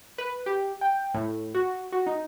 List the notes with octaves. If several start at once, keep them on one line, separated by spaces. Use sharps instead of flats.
B4
G4
G5
A2
F#4
F#4
D#4